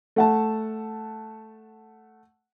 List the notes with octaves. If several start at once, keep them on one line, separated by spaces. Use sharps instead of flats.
A3 F#5 A5